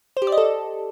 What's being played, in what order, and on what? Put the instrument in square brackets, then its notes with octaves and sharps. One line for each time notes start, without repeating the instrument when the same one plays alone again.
[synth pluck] C5
G4
D5
D#5
A4